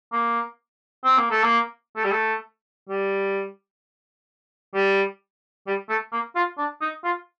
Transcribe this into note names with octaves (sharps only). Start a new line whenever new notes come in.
A#3
C4
A#3
A3
A#3
A3
G3
A3
G3
G3
G3
A3
A#3
F4
D4
D#4
F4